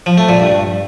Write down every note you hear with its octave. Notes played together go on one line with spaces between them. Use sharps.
F3
A3
A#2
G2